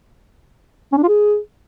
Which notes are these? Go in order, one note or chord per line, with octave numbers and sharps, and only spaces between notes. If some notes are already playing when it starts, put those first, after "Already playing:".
C#4
D4
F4
G#4